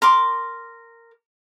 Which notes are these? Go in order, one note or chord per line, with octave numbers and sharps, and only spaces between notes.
A#4 C6 D6